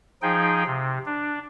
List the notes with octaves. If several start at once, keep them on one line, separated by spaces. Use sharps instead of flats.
F3 D#4 G#4 G5
C3
D4